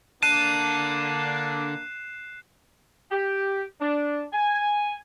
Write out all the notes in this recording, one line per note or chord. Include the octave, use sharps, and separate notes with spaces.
D3 A#3 D4 A5 F#6 C7 D#7 E7
G4
D4
G#5